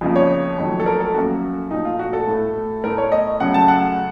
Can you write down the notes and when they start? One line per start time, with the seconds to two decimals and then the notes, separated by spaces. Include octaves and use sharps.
0.01 F2 C#3 F3 A#3
0.16 C#5
0.58 F2 D#3 F#3 A3
0.80 A4
0.86 A#4
1.00 A4
1.14 F#2 F3 A#3 F#4
1.71 A#2 F3 A3 D#4
1.85 F4
1.99 F#4
2.13 A4
2.27 A2 A3
2.84 A2 A3 A#4
2.98 C#5
3.12 D#5
3.40 F#2 C#3 F#3 A3 F#5
3.54 A5
3.68 F#5